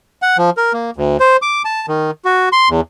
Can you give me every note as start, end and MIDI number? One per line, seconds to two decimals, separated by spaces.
0.22 0.37 78
0.38 0.50 53
0.57 0.73 70
0.73 0.91 58
0.96 1.17 38
1.20 1.37 72
1.42 1.62 86
1.65 1.86 81
1.88 2.11 51
2.25 2.49 66
2.52 2.69 84
2.69 2.81 40